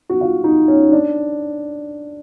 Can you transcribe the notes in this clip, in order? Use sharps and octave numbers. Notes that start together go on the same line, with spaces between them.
F#4
F4
D#4
C#4
D4